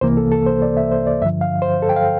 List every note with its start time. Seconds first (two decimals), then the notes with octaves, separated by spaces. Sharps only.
0.01 C2 C3 E3 A#3 C5
0.17 A4
0.32 A4
0.46 C5
0.62 D5
0.77 E5
0.92 C5
1.07 D5
1.21 G2 D3 F3 E5
1.41 F5
1.62 C5
1.82 A4
1.89 G5
1.96 F5